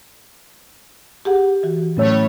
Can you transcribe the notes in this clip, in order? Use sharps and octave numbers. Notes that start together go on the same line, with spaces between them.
G4 G#4 F#5
E3 F#4
A2 F#3 A3 C#4 C#5 E6